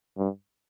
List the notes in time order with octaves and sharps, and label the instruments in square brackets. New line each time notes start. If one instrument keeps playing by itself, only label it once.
[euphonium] G2